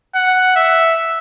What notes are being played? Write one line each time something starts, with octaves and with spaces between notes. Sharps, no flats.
F#5
E5